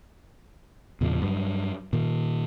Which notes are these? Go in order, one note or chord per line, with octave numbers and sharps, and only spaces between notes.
E2 A#2 C#3 F3
G2 F#3
A#2 D#3